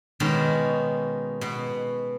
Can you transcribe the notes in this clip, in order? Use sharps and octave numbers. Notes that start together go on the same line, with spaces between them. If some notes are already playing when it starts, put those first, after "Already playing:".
B2 D#3 G#3 C#4
B2